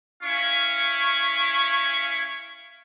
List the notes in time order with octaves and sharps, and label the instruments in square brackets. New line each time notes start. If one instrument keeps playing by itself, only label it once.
[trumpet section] C#4 E4 F5 C#6